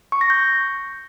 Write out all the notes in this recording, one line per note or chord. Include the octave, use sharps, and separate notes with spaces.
C#6
A#6
G6